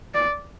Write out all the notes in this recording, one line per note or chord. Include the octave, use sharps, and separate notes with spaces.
D5